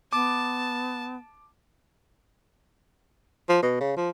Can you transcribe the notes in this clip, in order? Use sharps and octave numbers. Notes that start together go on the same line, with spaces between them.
B3 A5 D6
F3
B2
C#3
F3